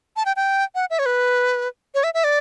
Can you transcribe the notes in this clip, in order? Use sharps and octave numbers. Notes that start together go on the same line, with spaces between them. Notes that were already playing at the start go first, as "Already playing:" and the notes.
A5
G5
G5
F#5
E5
C#5
B4
C#5
E5
E5
D5